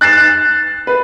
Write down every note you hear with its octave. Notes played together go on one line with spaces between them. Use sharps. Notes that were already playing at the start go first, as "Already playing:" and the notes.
F#6 A6 C7 E7
B4